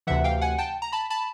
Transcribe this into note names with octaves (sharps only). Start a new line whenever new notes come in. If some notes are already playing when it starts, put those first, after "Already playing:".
D2 C3 E3 E5 F#5
F5 G5
F#5 G#5
G5 A5
A#5
A5 B5
A5 B5